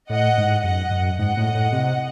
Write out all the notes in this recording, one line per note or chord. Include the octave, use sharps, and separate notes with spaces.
A2 D#5 F#5
G#2
F#2 D#5 F#5
F#2
G#2 D#5 F#5
A2
A2
C3